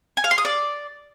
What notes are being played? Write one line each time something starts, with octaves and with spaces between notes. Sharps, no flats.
G#5
F5
C6
D#6
D5